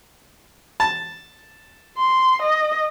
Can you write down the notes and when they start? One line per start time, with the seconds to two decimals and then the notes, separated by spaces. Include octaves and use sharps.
0.80 A5
1.98 C6
2.42 D#5